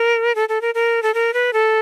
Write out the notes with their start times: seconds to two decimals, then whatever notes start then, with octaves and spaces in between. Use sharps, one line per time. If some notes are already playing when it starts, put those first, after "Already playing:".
Already playing: A#4
0.35 A4
0.49 A4
0.61 A#4
0.75 A#4
1.03 A4
1.14 A#4
1.34 B4
1.53 A4